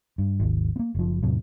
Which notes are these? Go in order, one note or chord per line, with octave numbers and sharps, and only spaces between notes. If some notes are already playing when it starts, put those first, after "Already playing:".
G2
G#1 D#2
A#3 B3
F#1 F3
E2 A2 C3 F#3